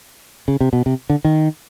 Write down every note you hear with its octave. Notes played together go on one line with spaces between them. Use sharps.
C#3
C3
B2
C3
D3
D#3